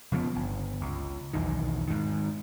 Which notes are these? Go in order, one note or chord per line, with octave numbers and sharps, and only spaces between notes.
C#3 F3 F#3 B3
G1
C#2
B1 E2 D#3
G#2 D#3